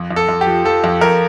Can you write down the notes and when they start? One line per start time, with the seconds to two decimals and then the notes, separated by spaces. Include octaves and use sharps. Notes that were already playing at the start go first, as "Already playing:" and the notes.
Already playing: F2
0.11 F2
0.16 A4
0.29 F2
0.41 G4
0.47 F3
0.65 F3 A4
0.84 F2
1.01 F2 A#4